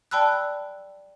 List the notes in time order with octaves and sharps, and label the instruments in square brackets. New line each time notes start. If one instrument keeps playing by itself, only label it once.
[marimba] D5 G5 A5 B5 E6 F#6